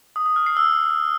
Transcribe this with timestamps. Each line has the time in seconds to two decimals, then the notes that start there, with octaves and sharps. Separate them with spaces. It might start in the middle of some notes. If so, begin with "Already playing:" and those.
0.16 D#6
0.26 D#6
0.36 F6
0.46 C7
0.57 E6